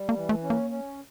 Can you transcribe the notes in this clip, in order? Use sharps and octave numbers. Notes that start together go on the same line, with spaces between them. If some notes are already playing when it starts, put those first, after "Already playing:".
Already playing: G3
A#3
E3
A3
C#4
A#3
C#4